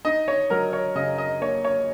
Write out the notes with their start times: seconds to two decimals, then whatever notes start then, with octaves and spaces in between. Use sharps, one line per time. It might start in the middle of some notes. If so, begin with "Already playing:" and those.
0.05 D#4 D#5
0.28 C#5
0.50 F#3 A#4
0.73 C#5
0.95 C#3 D#5
1.18 D#5
1.41 A#3 C#5
1.65 C#5